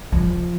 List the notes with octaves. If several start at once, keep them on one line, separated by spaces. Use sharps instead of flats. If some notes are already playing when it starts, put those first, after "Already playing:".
F3